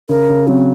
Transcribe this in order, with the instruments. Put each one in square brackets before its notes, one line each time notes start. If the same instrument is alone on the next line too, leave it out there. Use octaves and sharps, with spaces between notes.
[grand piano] C#3 [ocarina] A#4
[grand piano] C#3
[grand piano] F#3 [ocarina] C4